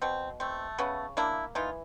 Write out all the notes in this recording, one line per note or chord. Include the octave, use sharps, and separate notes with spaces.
B2 C4
A3 C4
C#3 B3 C#4
A#3 D4 E4
E3 D#4 F4